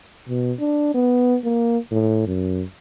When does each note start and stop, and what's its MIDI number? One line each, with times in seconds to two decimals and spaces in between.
0.29 0.53 47
0.60 0.92 62
0.94 1.37 59
1.45 1.78 58
1.91 2.23 45
2.27 2.63 42